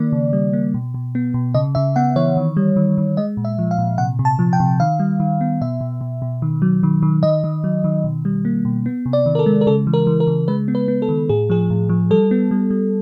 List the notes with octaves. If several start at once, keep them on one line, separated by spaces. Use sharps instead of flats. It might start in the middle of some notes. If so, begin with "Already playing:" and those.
Already playing: D#3 A#3 D5
C#3
G3
A#3
B2
B2
B3
B2
C#3 D#5
C#3 E5
B3 F#5
E3 C#5
D#3
G3
D#3
D#3
G#3 D#5
A#2
E5
F3
F5
A#2
C3 F#5
C3
A5
F3
G5
C3
D#3 F5
G3
D#3
B3
B2 E5
B2
B2
B2
D#3
F#3
D#3
D#3
D#3 D#5
D#3
F#3
D#3
B2
G3
A#3
B2
B3
C3
D5
D#3
A#4
A4
G#3
A#4
C#3 A4
E3
A#4
E3
A#4
C#3
G#3 B4
B3
B4
B3
A4
D#3
A2 G#4
F3 G#4
A2
F3
G3 A4
B3
G3
G3